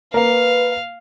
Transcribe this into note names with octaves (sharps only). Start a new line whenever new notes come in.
A#3 A#4 B4 F5